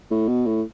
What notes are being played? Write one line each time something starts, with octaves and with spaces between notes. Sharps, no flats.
A2
B2
A2